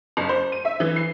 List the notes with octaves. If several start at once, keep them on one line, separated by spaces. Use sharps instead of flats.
F#1
C5
D#7
E5
E3
C7